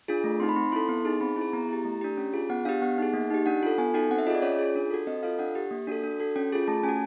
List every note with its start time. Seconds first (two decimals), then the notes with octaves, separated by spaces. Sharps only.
0.08 D4 F4 G#4
0.24 A3
0.40 C4 D#4 C6
0.49 B5
0.56 C4 C6
0.72 E4 A4 C6
0.89 B3
1.05 D#4 G#4
1.21 C4 B5
1.36 E4 G#4
1.53 B3 A#5
1.69 E4 G4
1.85 A3
2.01 D4 G4
2.17 C#4
2.34 F4 G#4
2.49 B3 F#5
2.65 D4 G4 F5
2.82 B3 F#5
2.98 D#4 G#4
3.14 A#3
3.30 D#4 G4
3.46 D4 F#5
3.63 F4 A4
3.78 B3 G#5
3.94 D#4 F#4 A4 G5
4.10 C4 F#5
4.18 E5
4.27 F4 G#4 D#5
4.34 D5
4.42 C#4 C#5
4.59 F4 G#4
4.75 D4
4.91 F#4 A4
5.07 C4 D#5
5.23 F4 A4 F5
5.39 D4 F#5
5.55 G4
5.71 A#3
5.87 D4 F#4 A4
6.03 D4
6.20 F#4 A4
6.36 C#4 G5
6.52 F4 G#4
6.68 A3 A5
6.83 C#4 G#5
6.89 F#4